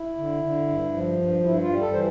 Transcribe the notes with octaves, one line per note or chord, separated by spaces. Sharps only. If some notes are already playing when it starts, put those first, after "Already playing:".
Already playing: E4
D3
D3
G2
F3
G2
G2 E4
F4
G3
A4
E3 C5